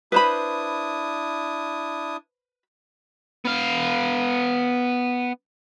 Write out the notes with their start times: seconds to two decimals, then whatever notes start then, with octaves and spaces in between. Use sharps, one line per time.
0.12 D4 E4 B4 C5 B5 D#6
3.45 B3 F5